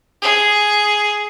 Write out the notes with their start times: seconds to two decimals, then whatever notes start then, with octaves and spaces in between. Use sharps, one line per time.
0.22 G#4